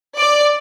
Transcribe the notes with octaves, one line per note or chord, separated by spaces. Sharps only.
D5